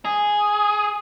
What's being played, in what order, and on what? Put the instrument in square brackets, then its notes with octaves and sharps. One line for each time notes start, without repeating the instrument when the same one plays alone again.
[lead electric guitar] G#4